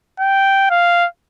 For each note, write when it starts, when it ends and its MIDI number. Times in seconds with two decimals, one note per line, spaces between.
0.20 0.68 79
0.70 1.07 77